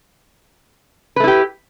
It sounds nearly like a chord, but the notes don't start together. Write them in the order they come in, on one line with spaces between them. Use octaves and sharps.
B4 A3 E4 G4